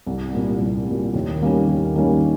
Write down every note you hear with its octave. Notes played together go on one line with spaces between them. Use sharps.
C2
A#2 G3
C2
A#2 G3
D#2
D#3 G3 A#3 C#4
D#2
D#3 G3 A#3 C#4